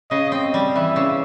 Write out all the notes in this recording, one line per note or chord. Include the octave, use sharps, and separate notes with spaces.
C#3 D#5
C4
G3
E3 E5
C#3